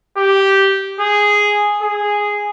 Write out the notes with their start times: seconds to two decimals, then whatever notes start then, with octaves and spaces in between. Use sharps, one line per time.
0.18 G4
1.00 G#4
1.83 G#4